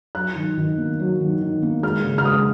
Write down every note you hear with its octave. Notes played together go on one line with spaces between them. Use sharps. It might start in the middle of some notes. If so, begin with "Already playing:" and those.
F#3 F#6
D#3
D#3
A#3
F#3
D#3
D#3
A#3
G#3 F6
C#3
F6
G#3 D#6